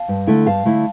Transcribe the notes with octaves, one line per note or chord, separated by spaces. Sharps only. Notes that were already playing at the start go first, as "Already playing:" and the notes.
Already playing: F5 A5
G2
D3 A3 E4
G2 F5 A5
D3 A3 E4